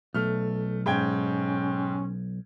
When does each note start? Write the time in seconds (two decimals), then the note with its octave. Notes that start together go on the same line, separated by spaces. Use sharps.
0.14 B1 A3 F6
0.86 G#2 C#4 G5 G#6